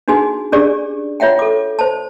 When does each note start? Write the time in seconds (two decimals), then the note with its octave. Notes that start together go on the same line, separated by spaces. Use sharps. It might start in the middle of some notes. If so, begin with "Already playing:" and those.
0.08 D4 D#4 F#4 G#4 G#5
0.52 C#4 D4 G4 G#4 D5 D6
1.20 F4 C#5 E5 F#5 G5
1.39 A4 D6
1.79 C5 A5